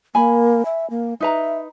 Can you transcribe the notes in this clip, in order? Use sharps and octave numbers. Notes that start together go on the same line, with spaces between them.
A#3 G#5 B5
E5
A#3
D#4 B4 E5 A#5